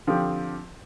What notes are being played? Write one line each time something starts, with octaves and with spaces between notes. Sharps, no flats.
D3 F3 C4 G4